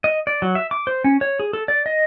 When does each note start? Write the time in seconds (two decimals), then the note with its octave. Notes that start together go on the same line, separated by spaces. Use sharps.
0.04 D#5
0.27 D5
0.42 F#3
0.55 E5
0.71 D6
0.87 C5
1.04 C#4
1.21 C#5
1.40 G#4
1.53 A4
1.68 D5
1.86 D#5